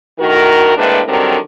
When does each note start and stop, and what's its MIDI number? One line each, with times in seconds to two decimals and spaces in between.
0.19 0.76 38
0.19 0.76 45
0.19 0.76 51
0.19 0.76 66
0.19 0.76 70
0.76 1.00 45
0.76 1.00 48
0.76 1.00 56
0.76 1.00 58
0.76 1.00 62
0.76 1.00 71
1.07 1.36 50
1.07 1.36 51
1.07 1.36 54
1.07 1.36 55
1.07 1.36 60
1.07 1.36 70